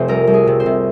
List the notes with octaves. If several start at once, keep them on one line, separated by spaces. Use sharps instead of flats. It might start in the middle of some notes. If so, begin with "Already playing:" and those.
Already playing: F1 C3 C5
C2 A#4
C2
G#4
C3
C5
C3